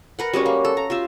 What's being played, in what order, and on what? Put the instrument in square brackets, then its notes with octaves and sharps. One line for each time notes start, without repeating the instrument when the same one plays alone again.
[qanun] A#4 B4 F#5
G3 G#3 C#4 F#4
A#3
A4
A#5
F4 G4 E5